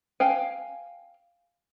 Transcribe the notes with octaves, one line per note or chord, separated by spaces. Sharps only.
F5 G5 G#5